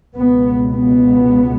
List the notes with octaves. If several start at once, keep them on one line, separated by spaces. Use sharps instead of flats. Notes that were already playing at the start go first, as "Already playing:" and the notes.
C#2 B2 B3
B3